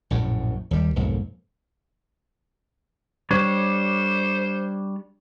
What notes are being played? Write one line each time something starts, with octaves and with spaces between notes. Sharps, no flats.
A#1 F#2 A2
D#2 G3
B1 F2 G#2 A#3
G3 D4 C5 C#5